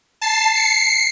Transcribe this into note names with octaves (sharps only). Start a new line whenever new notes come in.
A5 C7
C7 C#7